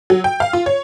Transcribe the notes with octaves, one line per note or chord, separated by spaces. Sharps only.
F#3
G5
F5
F4
C#5